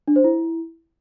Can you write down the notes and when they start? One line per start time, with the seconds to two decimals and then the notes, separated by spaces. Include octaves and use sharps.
0.08 D4
0.16 C5
0.24 E4